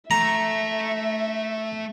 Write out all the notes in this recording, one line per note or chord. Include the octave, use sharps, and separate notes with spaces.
A3 E5 A#5